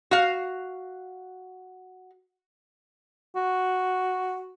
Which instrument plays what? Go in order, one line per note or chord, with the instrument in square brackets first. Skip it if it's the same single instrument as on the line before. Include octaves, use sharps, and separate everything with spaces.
[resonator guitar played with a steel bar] F#4 F5
[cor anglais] F#4